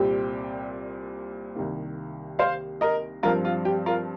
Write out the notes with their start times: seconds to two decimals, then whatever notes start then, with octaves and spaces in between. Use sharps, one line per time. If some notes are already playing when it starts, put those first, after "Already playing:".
Already playing: C2 A#2 G3 C4 G4
1.55 C2 C3 D#3 A#3
2.39 C5 F5
2.81 A#4 D#5
3.23 G2 F3 C4 F4 A#4
3.45 F4
3.65 G4
3.86 F4 A#4